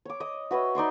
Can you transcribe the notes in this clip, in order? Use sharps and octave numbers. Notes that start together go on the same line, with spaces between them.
C#5 D6
D#5 D#6
F#4 B4 C#5 E5
D#4 D5 C6 C#6